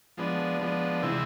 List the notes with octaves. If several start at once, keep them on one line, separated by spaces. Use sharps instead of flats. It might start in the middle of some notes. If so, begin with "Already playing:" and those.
F3 G#3 B3 D4
F3 G#3 B3 D4
C3 E3 G#3 C4 E4